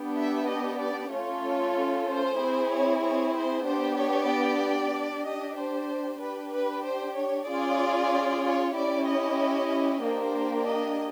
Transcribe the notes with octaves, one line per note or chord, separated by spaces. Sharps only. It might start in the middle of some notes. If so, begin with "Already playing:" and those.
Already playing: B3 D4 G4
E5
D#5
D5
A3 C#4 F4 A4 C#5
C5
C4 E4 G#4
C#5
C#5
C5
B3 D4 G4 C5
C#5
D5
D4 G4
D#5
C5
D4 G4 B4
B4
C5
C#5
C#4 F4 G#4 D5
C#5
C#4 E4 G4 D5
D#5
A#3 D4 G4 C5
D#5